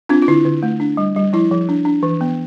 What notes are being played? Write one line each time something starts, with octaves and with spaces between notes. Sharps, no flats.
C4 D4 F4
F4
D3 E4
D3
A3
D4
G3
G3
F3 E4
F3
D4
D4
E3
B3